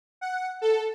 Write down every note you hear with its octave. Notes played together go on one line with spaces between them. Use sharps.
F#5
A4